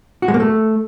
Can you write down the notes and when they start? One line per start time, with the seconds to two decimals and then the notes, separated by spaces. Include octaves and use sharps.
0.22 F#4
0.28 G#3
0.34 A#3
0.40 A3